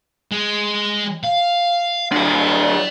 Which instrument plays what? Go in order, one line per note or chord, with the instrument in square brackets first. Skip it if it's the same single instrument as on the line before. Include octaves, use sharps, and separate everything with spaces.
[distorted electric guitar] G#3
F5
[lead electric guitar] D3 F#3 [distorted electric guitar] D5 G#5